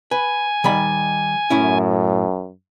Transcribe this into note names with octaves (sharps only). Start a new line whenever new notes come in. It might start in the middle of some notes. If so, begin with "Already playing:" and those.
B4 G#5
D#3 G3 B5
F#2 A2 C#4 E4